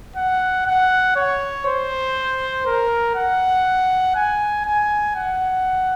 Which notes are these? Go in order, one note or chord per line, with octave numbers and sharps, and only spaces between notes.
F#5
F#5
C#5
C5
A#4
F#5
G#5
G#5
F#5